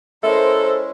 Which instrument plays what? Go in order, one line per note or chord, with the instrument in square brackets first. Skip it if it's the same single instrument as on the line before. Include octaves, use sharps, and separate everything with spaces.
[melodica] G#3 C#4 E4 [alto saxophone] A4 [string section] A#4 C5 [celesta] E5